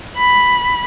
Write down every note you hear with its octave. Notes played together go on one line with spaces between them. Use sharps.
B5